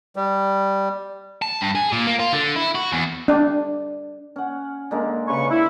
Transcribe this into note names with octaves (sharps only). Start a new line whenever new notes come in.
G3
A5
G2
G#4
A#2
A#3
F4
D3
E4
F#4
E2
D4
C#4 F#5
D3 G#3 A#3
C#3 B4 C#6
E4